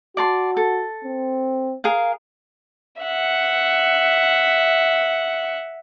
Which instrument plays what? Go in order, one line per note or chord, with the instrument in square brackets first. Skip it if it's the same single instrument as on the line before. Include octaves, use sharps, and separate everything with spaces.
[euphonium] F#4 [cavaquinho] D5 A5 C6
[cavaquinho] A4
[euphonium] C4
[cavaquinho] G#4 A#4 F5
[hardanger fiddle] E5 F#5